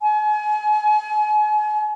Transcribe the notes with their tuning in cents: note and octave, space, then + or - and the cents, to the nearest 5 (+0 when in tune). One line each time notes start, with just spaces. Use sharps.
G#5 +35